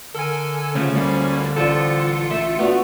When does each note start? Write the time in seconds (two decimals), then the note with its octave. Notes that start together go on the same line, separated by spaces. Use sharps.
0.15 D3 A4 A#4 G#5
0.75 C#3 F3 A3 C#4
0.94 D2 G3 A#3
1.56 A1 F3 G3 F4 A4 C#7
2.31 A3 E5
2.59 A3 B3 D4 F4 F#4